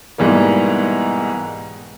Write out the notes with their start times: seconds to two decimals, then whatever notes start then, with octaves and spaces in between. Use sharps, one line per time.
0.18 G#2 B2 E3 G3 A#3